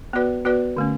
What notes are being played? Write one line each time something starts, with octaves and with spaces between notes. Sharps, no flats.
B3 F#4 B4 D5
B3 F#4 B4 D5
D3 A3 C#4